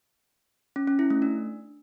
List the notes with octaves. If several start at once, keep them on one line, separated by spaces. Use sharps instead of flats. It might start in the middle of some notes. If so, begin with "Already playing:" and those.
C#4
C#4
E4
A3
D4